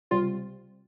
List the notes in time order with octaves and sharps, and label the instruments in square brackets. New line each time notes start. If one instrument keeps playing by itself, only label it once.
[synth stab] C#2 C3 G3 C4 [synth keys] F4